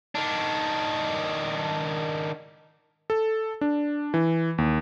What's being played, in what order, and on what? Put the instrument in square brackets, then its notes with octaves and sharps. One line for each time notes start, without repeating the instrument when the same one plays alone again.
[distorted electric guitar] D#3 D4
[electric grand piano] A4
D4
E3
D#2